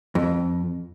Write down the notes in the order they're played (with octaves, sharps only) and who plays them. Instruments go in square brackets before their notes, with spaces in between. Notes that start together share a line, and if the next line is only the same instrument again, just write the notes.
[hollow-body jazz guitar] F2